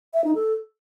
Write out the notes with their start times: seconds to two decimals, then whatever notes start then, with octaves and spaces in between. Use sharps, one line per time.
0.14 E5
0.24 D#4
0.35 A4